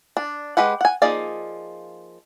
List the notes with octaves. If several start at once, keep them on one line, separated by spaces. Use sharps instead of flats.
D4
G#3 G4 B4 F#5
F#5 G#5
F3 A#3 D#4 G#4 D5